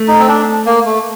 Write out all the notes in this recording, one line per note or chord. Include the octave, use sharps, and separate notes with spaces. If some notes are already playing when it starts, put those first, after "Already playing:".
Already playing: A3
D#4
C4
D4
A#3
A3